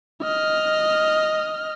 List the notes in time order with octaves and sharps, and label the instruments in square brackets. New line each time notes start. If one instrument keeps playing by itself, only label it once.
[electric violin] D#5 F6